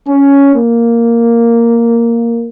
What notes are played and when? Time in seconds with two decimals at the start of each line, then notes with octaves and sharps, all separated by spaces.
0.08 C#4
0.54 A#3